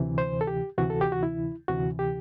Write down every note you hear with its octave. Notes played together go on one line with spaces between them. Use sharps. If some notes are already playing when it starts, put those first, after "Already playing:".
Already playing: D2 C3 E3
C5
A4
G4
D2 C3 E3 F#4
A4
G4
F#4
E4
D2 C3 E3 F#4
G4